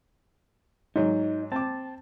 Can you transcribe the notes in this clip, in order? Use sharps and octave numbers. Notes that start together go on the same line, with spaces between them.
G#2 F#3 D#4
C4 A5 D6